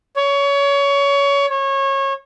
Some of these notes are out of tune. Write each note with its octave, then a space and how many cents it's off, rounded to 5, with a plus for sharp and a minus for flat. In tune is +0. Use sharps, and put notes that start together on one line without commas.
C#5 +25
C#5 -25